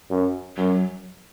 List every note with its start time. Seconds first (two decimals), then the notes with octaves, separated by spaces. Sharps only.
0.10 F#2
0.57 F#2 F#3